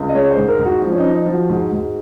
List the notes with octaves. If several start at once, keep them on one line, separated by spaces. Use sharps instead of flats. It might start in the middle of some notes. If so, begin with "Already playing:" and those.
Already playing: C#2
D#5
G#3 C#5
C5
G#2
A#4
G#2
F#4
F3
C#4
D#4
F3
D#4
F3
F#4
G#2
G#2